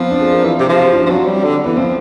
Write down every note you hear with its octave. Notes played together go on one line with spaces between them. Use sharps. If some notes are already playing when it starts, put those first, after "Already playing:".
Already playing: F3 B3 C4
D4
G#4
A#4
E3 B4
C3 G4
F3
F#4
E4
D4
C#4
F3
F#3 C4
G3
D3
E3 B3
F3 C4